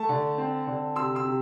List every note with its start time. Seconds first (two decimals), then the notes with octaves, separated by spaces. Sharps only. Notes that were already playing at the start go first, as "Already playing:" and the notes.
Already playing: A3 A5
0.09 D3
0.38 C4
0.67 D3
0.96 C3 C6 E6
1.15 C6 E6
1.25 C3